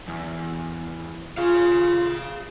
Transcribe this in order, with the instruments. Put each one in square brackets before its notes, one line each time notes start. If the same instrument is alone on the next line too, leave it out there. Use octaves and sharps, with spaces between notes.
[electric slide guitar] E2
[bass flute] F4 [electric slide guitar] G#4 F5